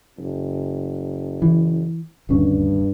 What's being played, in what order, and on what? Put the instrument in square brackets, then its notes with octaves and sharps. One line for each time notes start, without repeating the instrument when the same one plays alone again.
[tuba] F#1
[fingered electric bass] E3
[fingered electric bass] D#1 D2 C#4 [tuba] G2